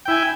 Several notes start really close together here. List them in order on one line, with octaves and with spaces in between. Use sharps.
G5 E4 G#5